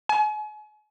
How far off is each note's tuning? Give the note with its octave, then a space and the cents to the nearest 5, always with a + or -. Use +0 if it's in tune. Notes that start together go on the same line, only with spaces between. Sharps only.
G#5 +40